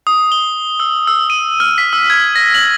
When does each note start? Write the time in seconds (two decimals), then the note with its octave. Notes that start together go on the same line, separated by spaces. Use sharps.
0.07 D#6
0.32 G7
0.80 E6
1.07 E6
1.30 D#7
1.60 F6
1.78 B6
1.93 E6
2.10 G#6
2.35 A#6
2.54 F#7